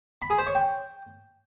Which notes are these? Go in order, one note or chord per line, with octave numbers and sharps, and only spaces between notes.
B5
G#4
C5
C#5
G5